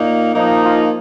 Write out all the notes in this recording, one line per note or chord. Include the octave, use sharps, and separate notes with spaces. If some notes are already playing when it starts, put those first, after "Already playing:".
Already playing: A#2 A#3 D#4
F3 A#3 D#4
F4